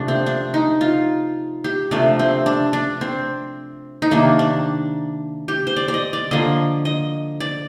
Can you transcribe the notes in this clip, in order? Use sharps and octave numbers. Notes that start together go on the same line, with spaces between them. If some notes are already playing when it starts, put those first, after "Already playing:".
Already playing: C3 F3 A3 D4
C4
D4
D#4
F4
G4
C3 F3 A3 D4
C4
D4
D4
C4
D#4
C3 D#3 A#3 D4
D4
G4
C5
D5
D5
D#5
D5
D3 F3 A#3 D#5
D#5
D5